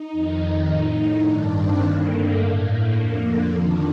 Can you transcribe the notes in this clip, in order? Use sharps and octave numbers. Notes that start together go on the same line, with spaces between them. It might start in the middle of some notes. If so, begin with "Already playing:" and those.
Already playing: D#4
F2 D#3
A2
G2 D#3 D4
C4
G2 D3 A#3
A3
A2 A#3
A3
F2 D3 A#3
A#3
F2 D#3 D4